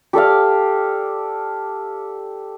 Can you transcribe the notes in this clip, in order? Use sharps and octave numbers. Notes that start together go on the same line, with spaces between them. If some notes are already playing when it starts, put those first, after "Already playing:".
G4 A4 D5 F5